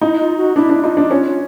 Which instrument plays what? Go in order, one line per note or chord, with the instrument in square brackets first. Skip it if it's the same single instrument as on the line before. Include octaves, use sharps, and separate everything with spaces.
[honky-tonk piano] D#4 [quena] E4
[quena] F4
F#4
[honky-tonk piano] D4 [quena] E4
[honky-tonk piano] D4
[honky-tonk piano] D#4 [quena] F4
[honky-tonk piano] D4
[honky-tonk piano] C#4 [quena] F4